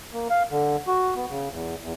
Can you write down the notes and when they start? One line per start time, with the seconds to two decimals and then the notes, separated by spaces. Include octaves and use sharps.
0.13 A#3
0.30 F5
0.51 D3
0.87 F#4
1.16 B3
1.30 C#3
1.51 E2
1.82 E2